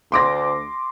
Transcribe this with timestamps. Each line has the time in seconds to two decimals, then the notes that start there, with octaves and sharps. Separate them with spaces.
0.12 D2 C6 D6 A#6